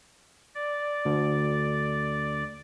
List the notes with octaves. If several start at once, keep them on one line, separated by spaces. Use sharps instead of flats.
D5
D2